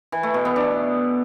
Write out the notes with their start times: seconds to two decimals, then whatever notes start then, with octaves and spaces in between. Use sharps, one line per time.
0.12 E3
0.23 A3
0.34 B2
0.45 B3
0.56 D4